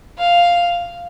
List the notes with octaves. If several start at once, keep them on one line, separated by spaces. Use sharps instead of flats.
F5